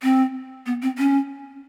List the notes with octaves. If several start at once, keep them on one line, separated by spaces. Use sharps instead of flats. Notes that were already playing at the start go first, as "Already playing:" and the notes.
C4
B3
C4
C#4